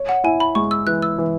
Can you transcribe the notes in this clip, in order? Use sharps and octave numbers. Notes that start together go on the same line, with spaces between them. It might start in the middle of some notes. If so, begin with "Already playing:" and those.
Already playing: C#5
F#5
E4 G#5
B5
G#3 C#6
E6
E3 F#6
E6
E3